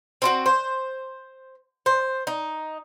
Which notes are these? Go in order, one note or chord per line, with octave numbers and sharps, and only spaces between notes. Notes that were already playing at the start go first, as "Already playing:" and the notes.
C4 E4 F#4
C5
C5
D#4